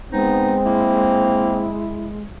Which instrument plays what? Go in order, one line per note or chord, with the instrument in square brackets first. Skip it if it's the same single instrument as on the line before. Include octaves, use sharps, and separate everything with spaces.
[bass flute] G#3 [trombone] B3 [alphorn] C4 [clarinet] D#4
[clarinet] A#3 [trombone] E4